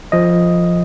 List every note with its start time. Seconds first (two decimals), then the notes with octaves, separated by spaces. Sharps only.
0.12 F3 D#5